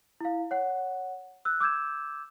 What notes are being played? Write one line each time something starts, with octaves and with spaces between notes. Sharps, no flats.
E4 F5
C#5 F#5
E6 F#6
D6 E6 G6 G#6 E7